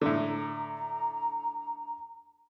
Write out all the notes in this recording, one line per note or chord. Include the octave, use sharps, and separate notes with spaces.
A2 D3 A#5